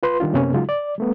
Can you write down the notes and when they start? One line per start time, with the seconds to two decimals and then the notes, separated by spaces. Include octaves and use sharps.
0.03 F4 B4 C6
0.20 D#3 G3 D4 F4
0.33 F#2 C3 A#3 B3 C#4
0.53 C#3 F#3 G#3 D#4 F4 F#4
0.69 D5
0.98 G3 A3 B3